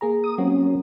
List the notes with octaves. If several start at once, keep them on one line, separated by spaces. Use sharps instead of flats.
A#3 G#4 A#5
D#6
F#3 A#3 C4 C#4 F#4